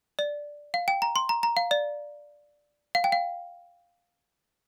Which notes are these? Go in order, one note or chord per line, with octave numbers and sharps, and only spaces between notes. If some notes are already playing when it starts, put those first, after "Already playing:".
D5
F5
G5
A#5
C6
A#5
A#5
F5
D5
F5
G5
F5